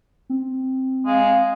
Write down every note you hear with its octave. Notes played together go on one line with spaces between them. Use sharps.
C4
G#3 F5